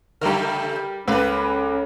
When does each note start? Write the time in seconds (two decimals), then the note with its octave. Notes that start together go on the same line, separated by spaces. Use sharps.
0.21 C#3 G3 A3 A#4
1.08 C#2 A#3 C#4 A4 B4